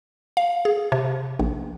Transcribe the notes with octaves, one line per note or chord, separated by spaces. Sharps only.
F5
G#4
C3
A#1